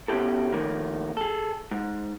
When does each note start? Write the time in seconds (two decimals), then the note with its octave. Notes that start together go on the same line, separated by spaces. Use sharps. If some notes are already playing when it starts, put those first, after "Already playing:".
0.08 B2 C#4 E4 G4 A4
0.52 D#3 F3 A3 A#3
1.17 G#4 A4
1.71 G#2